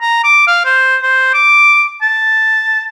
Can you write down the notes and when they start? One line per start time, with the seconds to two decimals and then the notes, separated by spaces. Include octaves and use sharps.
0.01 A#5
0.24 D6
0.47 F5
0.65 C5
1.02 C5
1.34 D6
2.02 A5